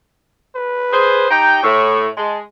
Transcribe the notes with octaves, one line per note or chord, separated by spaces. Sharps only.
B4
G#4 C5
D#4 G4 G5 A#5
A2 C#6
G#3 A5